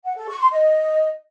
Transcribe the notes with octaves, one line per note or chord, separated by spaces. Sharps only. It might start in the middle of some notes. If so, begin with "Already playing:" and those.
F#5
A4
C#6
C6
D#5